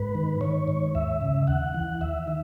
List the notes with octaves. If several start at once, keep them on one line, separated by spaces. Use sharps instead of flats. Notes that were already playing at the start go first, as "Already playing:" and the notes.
Already playing: G#2 B4
D#3
D#3 C#5
G#2
D#2 E5
C#3
D#2 F#5
E3
D#2 E5
D#3